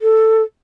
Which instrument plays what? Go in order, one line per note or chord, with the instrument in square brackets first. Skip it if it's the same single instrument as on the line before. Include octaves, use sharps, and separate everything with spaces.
[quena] A4